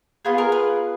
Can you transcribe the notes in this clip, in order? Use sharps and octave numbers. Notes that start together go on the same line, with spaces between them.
B3 F4 G#4 B4
A#4
B4